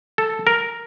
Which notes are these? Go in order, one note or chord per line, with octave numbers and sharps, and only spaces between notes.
A4
A#4